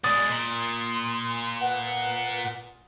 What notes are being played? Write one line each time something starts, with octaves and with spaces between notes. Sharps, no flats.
B2 G#3 D5 D#6 A6
A#2 C6
B4 F#5